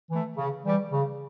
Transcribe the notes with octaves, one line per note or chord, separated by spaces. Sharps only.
E3 A3
C#3
E3 G3
C#3